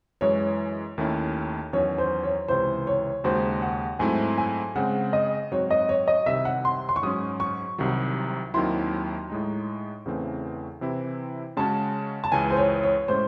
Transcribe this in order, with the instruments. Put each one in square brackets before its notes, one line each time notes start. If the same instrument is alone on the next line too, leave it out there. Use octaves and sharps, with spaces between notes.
[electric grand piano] F#2 E3 G#3 [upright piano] C#5
[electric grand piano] D#2 D#3 A3 C#4 E4
[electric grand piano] E2 D#3 F#3 C#4 [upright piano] C#5
[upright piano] C5
C#5
[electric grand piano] C#2 C3 E3 [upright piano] C5
[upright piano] C#5
[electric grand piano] D#2 C#3 G#3 D#4 F#4 [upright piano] C5
[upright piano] F#5
[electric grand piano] G#2 F#3 A3 C4 E4 [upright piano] G#5
[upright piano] G#5
[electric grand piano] C#3 G#3 C4 [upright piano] F#5
[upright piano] D#5
[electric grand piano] G#2 F#3 C4 F#4 [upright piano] C#5
[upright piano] D#5
C#5
D#5
[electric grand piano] C2 C3 D#3 [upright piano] E5
[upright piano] F#5
C6
C6
C#6
[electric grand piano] G#2 F#3 C#4 [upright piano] D#6
[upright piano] C#6
[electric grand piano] C2 C3 D#3 F#3
[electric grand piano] D#2 D#3 F#3 C4 E4 [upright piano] C6
[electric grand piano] A2 G#3 D#4
E2 C#3 E3 A3 C4
C3 E3 C4 E4
[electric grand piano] C#3 G#3 C#4 F#4 [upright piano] A5
[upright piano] A5
[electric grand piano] C#2 C#3 E3 [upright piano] G#5
[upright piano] C5
C#5
C#5
[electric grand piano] A2 G#3 C#4 [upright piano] C5